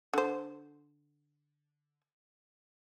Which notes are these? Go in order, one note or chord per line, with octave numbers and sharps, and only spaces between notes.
D3 C5